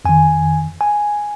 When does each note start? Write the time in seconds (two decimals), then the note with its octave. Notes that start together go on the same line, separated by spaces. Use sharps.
0.05 F2 D#3 G#5
0.81 G#5